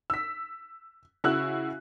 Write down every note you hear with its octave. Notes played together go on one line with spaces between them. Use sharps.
E6 B6
C#3 E4 F#4 E6 F#6